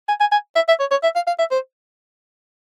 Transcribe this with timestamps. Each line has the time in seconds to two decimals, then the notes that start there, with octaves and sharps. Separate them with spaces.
0.08 G#5
0.20 G#5
0.32 G#5
0.55 E5
0.68 E5
0.80 C#5
0.91 C#5
1.03 E5
1.15 F5
1.27 F5
1.39 E5
1.51 C5